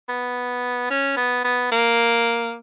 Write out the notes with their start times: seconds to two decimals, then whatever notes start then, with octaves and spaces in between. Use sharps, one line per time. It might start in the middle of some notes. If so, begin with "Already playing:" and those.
0.09 B3
0.90 C#4
1.17 B3
1.44 B3
1.71 A#3